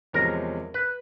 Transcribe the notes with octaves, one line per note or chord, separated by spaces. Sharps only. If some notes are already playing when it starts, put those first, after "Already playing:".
E2 C3 F3 G#3 C#4 A#4
B4